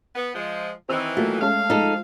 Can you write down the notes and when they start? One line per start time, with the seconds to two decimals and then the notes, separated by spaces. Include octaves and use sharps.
0.15 B3
0.35 F3 G#3
0.89 D#3 E3 C4 E6 F7
1.17 F#3 A3 A#3 F4
1.41 G#3 C#4 F5 A5
1.70 F3 G#3 D#4 A4